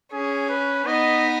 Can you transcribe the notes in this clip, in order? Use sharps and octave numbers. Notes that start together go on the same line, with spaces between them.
C#4 G#4
B4
B3 D#4 D#5